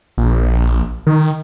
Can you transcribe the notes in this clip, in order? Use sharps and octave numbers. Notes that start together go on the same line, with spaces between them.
A#1
D#3